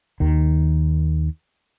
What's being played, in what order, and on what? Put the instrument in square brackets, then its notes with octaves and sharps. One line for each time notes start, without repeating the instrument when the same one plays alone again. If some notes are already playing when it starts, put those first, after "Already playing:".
[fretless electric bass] D#2 D#3